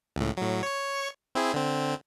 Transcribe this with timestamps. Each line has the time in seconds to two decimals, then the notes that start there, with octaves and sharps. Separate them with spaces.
0.16 C#2 A2
0.37 A2 F#3
0.63 C#5 C#6
1.35 C4 E4 G#4
1.54 D3 C4